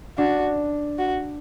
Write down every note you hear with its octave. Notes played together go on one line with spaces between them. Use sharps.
D4 F#4
F#4